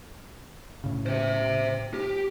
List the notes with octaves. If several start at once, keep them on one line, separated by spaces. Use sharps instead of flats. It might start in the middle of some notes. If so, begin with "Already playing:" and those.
A2 C#3
C5 E5
G4